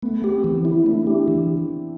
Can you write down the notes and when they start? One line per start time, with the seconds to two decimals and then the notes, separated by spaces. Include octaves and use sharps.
0.02 A3 B3
0.24 G4
0.30 C4
0.44 E3
0.65 E4
0.86 A3 D4
0.97 E4
1.07 B3 D4 G4
1.28 E3